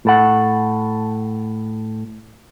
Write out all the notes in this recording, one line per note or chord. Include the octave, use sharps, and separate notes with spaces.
A2 A4 F#5